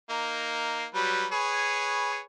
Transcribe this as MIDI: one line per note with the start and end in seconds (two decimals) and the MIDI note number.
0.10 0.85 58
0.10 0.85 63
0.95 1.25 54
0.95 1.25 55
0.95 1.25 71
1.32 2.20 68
1.32 2.20 71
1.32 2.20 73